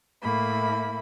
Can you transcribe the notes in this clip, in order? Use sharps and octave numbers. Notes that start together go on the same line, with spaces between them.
A2 A#3 E4 B5